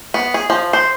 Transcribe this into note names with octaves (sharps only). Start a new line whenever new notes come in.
B3
G#4
F3
C5